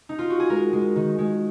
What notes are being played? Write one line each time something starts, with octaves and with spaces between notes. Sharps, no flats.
D#4
F4
F#4
G#4
G#3 A#4
G#3
D#3
G#3